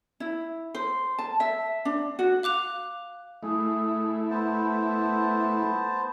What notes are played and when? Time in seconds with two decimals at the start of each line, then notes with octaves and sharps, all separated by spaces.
0.20 E4
0.75 C5
1.19 A5
1.40 E5
1.85 D4
2.19 F#4
2.43 F5 D6 F#6 F7
3.43 A3 E4 G#4
4.30 B3 C5 A5